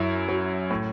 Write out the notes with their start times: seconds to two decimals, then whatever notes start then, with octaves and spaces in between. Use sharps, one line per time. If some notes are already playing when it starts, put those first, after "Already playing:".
Already playing: F#2 E4
0.29 F#3
0.70 A2